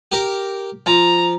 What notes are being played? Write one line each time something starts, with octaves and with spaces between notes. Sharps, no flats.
G4 A#4
F3 A#5